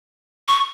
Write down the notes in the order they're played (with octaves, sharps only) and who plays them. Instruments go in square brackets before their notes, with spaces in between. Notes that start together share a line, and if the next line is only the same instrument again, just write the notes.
[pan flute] C#6